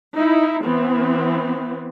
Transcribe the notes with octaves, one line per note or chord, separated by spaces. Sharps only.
D#4 E4
E3 B3 C4